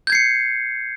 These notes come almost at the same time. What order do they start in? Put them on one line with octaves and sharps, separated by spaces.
G6 G#6 C7 C#7